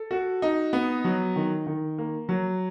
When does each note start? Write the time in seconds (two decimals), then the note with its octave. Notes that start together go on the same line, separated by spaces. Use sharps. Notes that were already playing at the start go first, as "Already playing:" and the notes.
Already playing: A4
0.11 F#4
0.42 D#4
0.73 B3
1.04 F#3
1.36 D#3
1.67 D#3
1.98 A#3
2.29 F#3